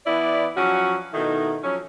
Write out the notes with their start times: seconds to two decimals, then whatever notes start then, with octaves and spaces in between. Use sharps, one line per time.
0.06 E3 B3 E4 D5
0.57 F3 F#3 C#4 F#4
1.13 B2 D#3 A3 D#4 E4
1.63 F3 F#3 C#4